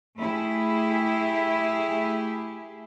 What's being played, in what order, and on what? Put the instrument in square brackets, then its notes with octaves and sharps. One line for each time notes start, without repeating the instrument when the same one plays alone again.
[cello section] A3 E4 G4 G#4